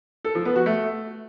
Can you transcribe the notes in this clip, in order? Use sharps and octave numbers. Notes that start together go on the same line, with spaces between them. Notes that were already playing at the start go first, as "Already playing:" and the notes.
A4
F3
B3
F#4
A3